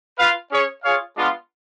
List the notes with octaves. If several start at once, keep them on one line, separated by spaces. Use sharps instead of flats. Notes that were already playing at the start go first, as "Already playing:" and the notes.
F4 B4 F5
C#4 G#4 C#5
F4 G#4 C#5 F5
G#3 B3 D4 F4